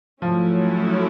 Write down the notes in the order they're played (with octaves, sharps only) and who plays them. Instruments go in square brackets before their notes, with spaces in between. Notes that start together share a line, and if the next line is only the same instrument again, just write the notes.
[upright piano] F3 [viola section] F#3 A3 C#4 E4